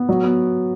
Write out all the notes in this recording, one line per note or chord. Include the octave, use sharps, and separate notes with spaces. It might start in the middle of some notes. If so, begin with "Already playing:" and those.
Already playing: B3
F#3
B3